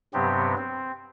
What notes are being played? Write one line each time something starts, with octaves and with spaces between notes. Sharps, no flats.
G2 C3 F#3 B3 C4 G4
C4